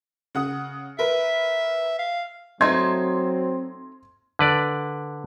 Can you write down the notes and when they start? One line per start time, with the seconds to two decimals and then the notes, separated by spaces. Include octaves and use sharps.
0.35 C#3 F#5 D#6
0.99 A#4 B4 E5
1.99 F5
2.61 F#3 A3 C4 D#4 C6 G#6
4.39 D3 B4 D5